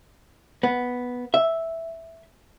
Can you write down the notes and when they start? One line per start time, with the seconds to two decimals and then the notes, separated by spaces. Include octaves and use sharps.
0.63 B3
1.34 E5